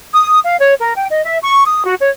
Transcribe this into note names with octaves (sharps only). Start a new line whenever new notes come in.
D#6
F5
C#5
A#4
G5
D#5
E5
C#6
D#6
F#4
C#5